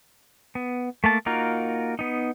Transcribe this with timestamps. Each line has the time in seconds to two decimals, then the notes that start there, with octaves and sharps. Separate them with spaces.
0.55 B3
1.04 A3 A#3 A5
1.26 A#3 D#4 F4 F#4 A#4
1.99 B3 D#4